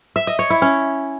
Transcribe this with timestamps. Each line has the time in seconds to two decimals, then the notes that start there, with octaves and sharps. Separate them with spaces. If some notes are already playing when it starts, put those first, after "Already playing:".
0.16 E5
0.27 D#5
0.39 C#5
0.50 E4
0.62 C#4